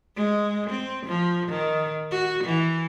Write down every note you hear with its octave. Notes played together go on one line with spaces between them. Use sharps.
G#3
C4
F3
D#3
F#4
E3